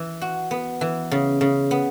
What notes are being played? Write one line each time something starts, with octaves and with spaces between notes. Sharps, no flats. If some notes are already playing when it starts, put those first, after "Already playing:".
Already playing: E3
F#4
B3
E3
C#3
C#3
B3